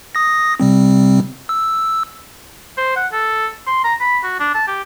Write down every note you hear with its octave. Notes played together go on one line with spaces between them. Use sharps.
D#6 A#6
C3 G3 C4
E6
C5
F#5
A4
C6
A#5
B5
F#4
D4
A5
G4